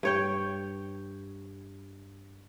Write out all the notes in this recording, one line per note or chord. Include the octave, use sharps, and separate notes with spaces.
G2 C#5 G5